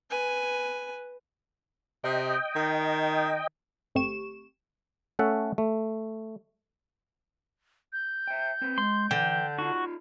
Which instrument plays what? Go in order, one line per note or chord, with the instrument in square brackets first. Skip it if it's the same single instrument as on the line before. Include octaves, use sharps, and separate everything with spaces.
[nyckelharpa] B4 G#5
[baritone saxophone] C3 [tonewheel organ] D#5 G5
[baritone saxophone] D#3
[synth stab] G1 A3 C4 G4 C#6 E7
[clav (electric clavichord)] A3 C#4 A4 E5 F#5
A3
[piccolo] G6
[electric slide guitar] E5 G5
C4 B4
[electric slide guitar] G#3 [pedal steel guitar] C6
[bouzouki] D3 [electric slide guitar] E3 [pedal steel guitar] G5
[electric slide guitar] D#4 F4 [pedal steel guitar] F#4